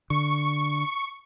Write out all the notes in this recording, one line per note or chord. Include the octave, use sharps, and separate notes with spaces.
D3 C#6